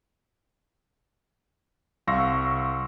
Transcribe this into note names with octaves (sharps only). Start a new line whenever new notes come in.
C2 F5 C6 C#6 E6 A#6